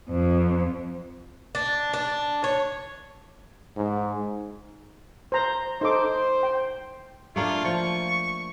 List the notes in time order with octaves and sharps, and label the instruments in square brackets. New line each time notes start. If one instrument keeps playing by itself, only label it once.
[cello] F2
[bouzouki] D4
D4
C#5
[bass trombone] G#2
[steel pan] C5 A#5
[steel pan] D#4 A4 D6 [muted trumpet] C5
[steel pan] G5
[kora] A3 A#3 D4 [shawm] F4
[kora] F3 [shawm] C#6